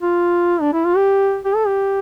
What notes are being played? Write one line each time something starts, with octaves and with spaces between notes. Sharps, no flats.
F4
D4
E4
F4
G4
G4
A4
G4